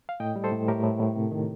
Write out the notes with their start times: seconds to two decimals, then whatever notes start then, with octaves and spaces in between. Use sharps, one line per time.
0.09 F5
0.20 A2 D#5 G5
0.36 G3
0.44 A4 C5
0.52 A2
0.68 A2 G4 A#4
0.83 A2
1.00 A2
1.16 C3
1.32 D#3